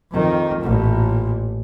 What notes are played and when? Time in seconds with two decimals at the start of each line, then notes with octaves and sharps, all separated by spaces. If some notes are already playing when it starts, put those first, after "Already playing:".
0.11 F2 D#3
0.61 A1 A#2